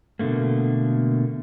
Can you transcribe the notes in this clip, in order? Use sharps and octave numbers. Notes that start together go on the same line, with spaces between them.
B2 D3 A3 A#3